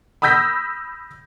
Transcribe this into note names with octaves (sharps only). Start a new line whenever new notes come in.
B5 D#6 E6 G6 A#6 B6